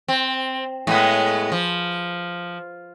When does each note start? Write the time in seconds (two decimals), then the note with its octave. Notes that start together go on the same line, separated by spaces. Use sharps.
0.08 C4
0.87 A2 G#3 B3
1.52 F3